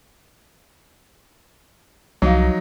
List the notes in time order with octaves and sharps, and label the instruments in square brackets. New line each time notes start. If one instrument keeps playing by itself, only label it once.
[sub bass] C2 [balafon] F3 F5 [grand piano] F#3 D#4